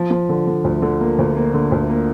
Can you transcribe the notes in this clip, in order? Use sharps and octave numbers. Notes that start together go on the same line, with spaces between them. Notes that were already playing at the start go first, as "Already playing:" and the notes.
Already playing: F3
F3
D3
D3
D2
D3
A#3
D2
A#3
D3
D2
A#3